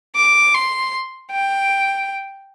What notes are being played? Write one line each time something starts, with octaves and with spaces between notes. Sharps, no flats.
D6
C6
G5